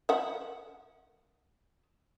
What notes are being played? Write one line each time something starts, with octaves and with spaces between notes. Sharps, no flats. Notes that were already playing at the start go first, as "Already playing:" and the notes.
E5 F#5